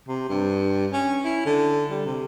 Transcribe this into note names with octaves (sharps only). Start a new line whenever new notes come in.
C3
G2
C#4
E4
D3
G3
C3